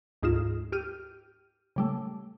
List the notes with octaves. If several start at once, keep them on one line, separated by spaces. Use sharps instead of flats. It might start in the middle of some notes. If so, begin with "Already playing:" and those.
D2 G#2 D#4 F4 E7
G4 F6 D#7
C#3 G3 A3